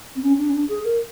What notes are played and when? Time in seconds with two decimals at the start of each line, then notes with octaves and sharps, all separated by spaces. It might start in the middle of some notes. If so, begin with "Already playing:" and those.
0.15 C4
0.22 C#4
0.38 D4
0.49 C#4
0.53 D4
0.68 G#4
0.84 A#4